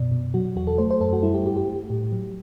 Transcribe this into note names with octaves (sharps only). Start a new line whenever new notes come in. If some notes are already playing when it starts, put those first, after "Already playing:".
Already playing: F#2 B2 D5
B2
F#3 F#4
E2 F#4
A4
A3 C5
C5
F#2 A4
F#4
G3 E4
G4
G2 G4
G4
A3
A2
F#3